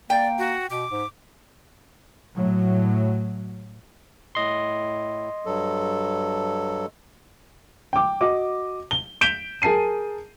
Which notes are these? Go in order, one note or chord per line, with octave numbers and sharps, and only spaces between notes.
A#3 D5 G5
F#4
B2 D6
G#2
A2 F#3
A2 D#5 C6
G2 F#3 A4
G5 D6
F#4 D#5 D6
G7
G6 B6 D7 E7 F7 G7
G#4 A#4 A5 C7 D#7